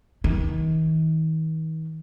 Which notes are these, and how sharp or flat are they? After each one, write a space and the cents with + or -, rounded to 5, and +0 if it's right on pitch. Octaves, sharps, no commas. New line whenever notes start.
D#3 +40